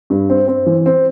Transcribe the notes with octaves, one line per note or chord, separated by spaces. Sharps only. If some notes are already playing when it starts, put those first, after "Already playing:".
G2
C4
C4
E3
C4